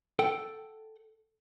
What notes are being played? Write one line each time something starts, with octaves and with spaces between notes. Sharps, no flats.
A4 F#5 G5